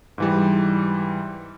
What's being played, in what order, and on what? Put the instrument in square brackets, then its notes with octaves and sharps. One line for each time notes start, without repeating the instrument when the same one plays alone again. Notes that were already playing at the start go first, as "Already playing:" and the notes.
[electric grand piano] G#2 E3 G3